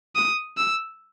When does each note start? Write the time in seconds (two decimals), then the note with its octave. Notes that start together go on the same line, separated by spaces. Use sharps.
0.16 D#6
0.57 E6